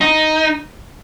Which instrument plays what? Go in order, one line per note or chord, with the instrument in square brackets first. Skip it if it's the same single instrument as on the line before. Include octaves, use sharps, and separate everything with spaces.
[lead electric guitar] D#4